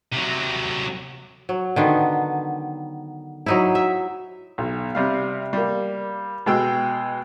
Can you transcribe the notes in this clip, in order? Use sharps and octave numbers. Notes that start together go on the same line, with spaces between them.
C3 F#3
F#3
D3 D#3 B3
F#3 D#4 E4
E5
B1
C3 G3 F5
G3 A#3
B2 G#3 G5 E6